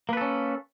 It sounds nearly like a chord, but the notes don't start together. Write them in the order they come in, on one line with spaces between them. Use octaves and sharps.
A#3 B4 A4 C#4